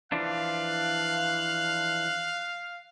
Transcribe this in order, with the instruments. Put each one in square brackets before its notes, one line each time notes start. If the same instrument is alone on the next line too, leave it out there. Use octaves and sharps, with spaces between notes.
[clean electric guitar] E3 F3 D4 [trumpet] F5 [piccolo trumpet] F#6